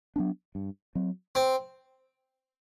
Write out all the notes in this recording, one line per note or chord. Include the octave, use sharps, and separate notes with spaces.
F#3 B3 D4
G2
F#3 C4
C4